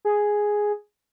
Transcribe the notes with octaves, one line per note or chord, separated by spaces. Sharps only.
G#4